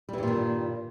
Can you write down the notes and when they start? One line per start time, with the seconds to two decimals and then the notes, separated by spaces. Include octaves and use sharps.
0.09 G3
0.13 E3
0.18 G2
0.23 A#2
0.27 D#3